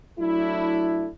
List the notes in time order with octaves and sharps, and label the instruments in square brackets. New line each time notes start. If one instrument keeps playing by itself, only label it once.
[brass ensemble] F#3 A3 D4 E4